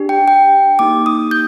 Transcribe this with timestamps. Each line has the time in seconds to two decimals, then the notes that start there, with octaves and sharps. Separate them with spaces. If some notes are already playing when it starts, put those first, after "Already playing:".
Already playing: D4 G4
0.09 G5
0.28 G5
0.79 A#3 D#4 G4 D6
1.06 D#6
1.31 G6